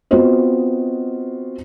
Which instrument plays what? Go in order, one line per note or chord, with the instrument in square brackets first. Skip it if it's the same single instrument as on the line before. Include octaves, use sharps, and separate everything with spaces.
[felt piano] B3 C4 F4 F#4 C5 D#5